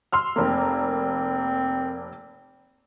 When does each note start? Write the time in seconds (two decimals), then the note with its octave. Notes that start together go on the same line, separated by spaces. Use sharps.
0.12 C6 E6 F6
0.36 F1 A#3 C4